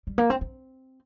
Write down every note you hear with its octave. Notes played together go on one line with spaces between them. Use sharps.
G3
A#3
C4
C4